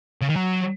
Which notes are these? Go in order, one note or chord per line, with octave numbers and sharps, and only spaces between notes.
C#3
D#3
F#3